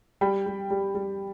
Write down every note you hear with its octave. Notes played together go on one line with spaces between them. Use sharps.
G3 G5 B5
G3
G3
G3